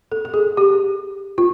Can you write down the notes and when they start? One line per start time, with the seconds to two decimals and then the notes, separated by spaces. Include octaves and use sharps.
0.12 A4
0.25 A4
0.34 G#4
0.57 G4
1.38 F4